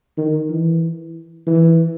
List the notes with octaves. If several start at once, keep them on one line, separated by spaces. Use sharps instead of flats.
D#3
E3
E3